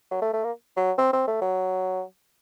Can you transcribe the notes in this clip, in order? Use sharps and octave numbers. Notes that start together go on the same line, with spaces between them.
F#3
A3
A3
A#3
F#3
C4
C4
A3
F#3